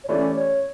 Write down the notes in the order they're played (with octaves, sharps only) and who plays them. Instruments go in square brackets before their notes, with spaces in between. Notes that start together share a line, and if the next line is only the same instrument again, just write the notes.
[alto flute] C#5
[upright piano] E3 A3 C#4 G4 [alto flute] D5
[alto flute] C#5